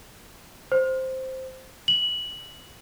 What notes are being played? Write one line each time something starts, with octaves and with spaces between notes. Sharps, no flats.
C5
F#7